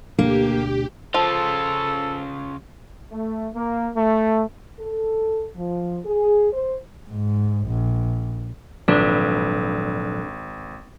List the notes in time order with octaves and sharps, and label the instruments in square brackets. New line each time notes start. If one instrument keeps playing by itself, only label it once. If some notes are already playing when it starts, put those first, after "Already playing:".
[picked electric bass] D2 B2 D4 [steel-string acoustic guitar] A#3 [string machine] G4
[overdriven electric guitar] C#3 F4 [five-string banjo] F3 [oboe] A4
[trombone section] A3
A#3
A3
[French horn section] A4
F3
G#4
C5
[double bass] G#2
A#1
[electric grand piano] G#1 [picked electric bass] A#2 F3 F#3 [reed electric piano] D4 [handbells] A4 B4 D5